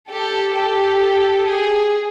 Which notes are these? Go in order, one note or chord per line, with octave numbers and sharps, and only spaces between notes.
G4 A4
G4 A4
G#4